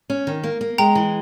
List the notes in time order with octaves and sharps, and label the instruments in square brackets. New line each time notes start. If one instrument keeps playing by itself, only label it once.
[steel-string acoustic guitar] C#4
D#3
A#3
A#3
[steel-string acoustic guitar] G#3 [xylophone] G5 A#5
[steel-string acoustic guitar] E3